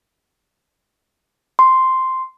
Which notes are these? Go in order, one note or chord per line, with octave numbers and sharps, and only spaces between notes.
C6